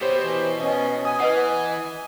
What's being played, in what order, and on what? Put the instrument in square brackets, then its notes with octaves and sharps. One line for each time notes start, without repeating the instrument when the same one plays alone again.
[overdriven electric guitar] B2 [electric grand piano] G4 C5 C#5
[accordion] E3
[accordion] B3 C#4 [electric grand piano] D#5
[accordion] G#5 [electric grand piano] D#6
[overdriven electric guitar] E3 [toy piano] B4 D#5 F#5